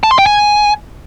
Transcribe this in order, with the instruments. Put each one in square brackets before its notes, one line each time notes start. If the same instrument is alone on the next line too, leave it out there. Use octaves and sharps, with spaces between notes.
[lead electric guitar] A5
C6
G5
G#5